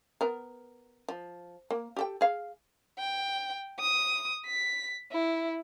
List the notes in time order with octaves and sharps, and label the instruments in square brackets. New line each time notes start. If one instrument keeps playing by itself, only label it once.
[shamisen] B3 A#4
F3
A#3
G4 A4 G5
G#4 F5
[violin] G5
D#6
B6
E4